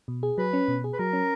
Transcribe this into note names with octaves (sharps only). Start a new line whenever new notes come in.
B2
G#4
F#3 B4
C#4
B2
G#4
B4
F#3 A#4
C#4